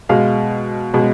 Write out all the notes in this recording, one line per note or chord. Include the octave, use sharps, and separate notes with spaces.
B2 G#3 F5
B2 G#3